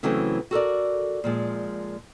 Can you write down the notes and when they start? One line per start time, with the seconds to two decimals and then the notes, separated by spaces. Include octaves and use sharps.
0.03 C#3 E3 F#3 A3 C4 C#4
0.51 F#4 A4 A#4 D5
1.24 A#2 F3 G#3